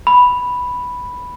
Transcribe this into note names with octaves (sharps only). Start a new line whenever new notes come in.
B5